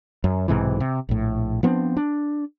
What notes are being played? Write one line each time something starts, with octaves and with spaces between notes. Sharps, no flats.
F#2
B1 G#2 C3 E3
C3
A#1 A2
F3 B3 C4 D4
D4